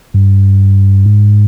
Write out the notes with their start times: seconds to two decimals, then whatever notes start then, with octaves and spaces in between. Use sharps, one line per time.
0.14 G2
1.06 G#2